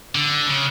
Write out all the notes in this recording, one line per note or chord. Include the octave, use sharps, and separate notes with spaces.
D3
C#3